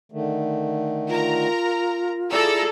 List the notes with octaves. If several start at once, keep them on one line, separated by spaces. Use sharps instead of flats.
D3 D#3 A3
F4 A#4 A#5
E4 G#4 A4 D5 A#5 E6